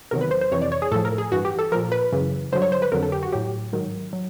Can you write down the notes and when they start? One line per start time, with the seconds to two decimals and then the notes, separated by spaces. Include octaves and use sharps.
0.11 E2 C3 D#3 F#3 A#4
0.21 B4
0.31 C5
0.41 C5
0.52 F2 C3 E3 C#5
0.62 D5
0.72 C#5
0.82 G#4
0.91 A2 A4
0.96 F3
1.05 A#4
1.18 G#4
1.32 G2 E3 F#4
1.45 G4
1.59 A4
1.72 A#2 F3 A#4
1.92 B4
2.12 F#2 C#3 E3
2.52 G2 D3 F#3 C5
2.62 C#5
2.72 C5
2.82 B4
2.92 F2 D3 F#3 A#4
3.03 A4
3.12 G4
3.23 F#4
3.33 A2 F#3 G4
3.73 G#2 D#3 F#3
4.13 F#3